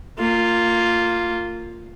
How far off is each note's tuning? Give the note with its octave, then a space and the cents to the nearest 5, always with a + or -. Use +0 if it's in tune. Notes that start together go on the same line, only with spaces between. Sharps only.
A#3 -25 F4 +0